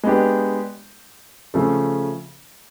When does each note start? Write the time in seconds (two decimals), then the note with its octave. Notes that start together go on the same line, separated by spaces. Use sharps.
0.04 G#3 B3 D4 G4
1.54 C#3 F3 A3